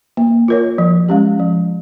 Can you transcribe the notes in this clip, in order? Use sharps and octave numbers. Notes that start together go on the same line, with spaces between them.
A#3
F4 A#4 C#5
F3
G#3 C#4 G4
F3